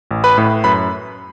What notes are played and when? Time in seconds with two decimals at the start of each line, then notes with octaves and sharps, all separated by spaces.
0.11 A1
0.24 B4 B5
0.38 A2
0.64 F#2 B4 B5